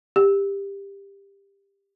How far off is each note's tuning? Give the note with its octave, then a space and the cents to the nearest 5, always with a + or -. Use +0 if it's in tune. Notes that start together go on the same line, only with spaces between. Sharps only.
G4 +20